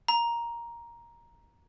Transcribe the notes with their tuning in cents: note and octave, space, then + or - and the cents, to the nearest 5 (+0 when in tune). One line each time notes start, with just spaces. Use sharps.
A#5 +10